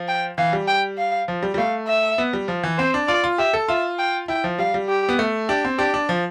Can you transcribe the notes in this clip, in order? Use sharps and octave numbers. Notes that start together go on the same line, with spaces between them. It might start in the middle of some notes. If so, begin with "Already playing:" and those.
Already playing: F3
G5
E3 F5
G3
G5
F5
F3
G3
G3
A3 F5
E5
B3
G3
F3
E3
C4 C5
D4
F4 D5
F4
G4 E5
A4
F4 E5
G5
E4 G5
F3
G3 F5
G3
G4
B3
A3
D4 G4
C4
D4 G4
D4
F3